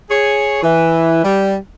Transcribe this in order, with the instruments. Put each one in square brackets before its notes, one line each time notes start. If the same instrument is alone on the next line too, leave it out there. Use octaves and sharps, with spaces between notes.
[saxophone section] G#4 C#5
E3
G3